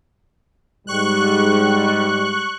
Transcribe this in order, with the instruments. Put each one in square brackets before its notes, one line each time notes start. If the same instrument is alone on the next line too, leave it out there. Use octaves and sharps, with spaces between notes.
[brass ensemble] G#2 G3 [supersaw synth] C#6 F#6